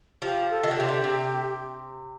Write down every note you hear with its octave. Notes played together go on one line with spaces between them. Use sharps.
F3 G4
A4
D#3
D3
C3 G4
D3
C3